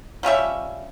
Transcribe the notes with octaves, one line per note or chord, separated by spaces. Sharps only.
F3 G3 C#4 E5